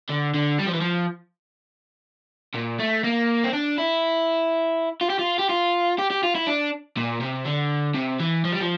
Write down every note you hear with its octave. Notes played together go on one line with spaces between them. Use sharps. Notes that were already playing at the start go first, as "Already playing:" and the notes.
D3
D3
G3
F3
E3
F3
A#2
A3
A#3
C4
D4
E4
F4
G4
F4
G4
F4
G4
G4
F4
E4
D4
A#2
C3
D3
C3
E3
F3
G3
F3